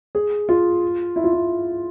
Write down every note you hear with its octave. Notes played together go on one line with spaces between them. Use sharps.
G#4
F4
E4
F4
E4